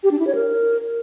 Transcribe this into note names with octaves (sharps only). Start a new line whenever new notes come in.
G4
D4
E4
C#5
A#4